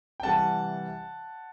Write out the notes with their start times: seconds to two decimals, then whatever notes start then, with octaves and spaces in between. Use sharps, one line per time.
0.20 G5
0.23 C3 E3 G3 F#5 A5